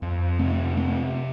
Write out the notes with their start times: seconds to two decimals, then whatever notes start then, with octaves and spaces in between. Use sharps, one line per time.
0.02 F2
0.39 C3 A3 C4
0.76 C3 A3 C4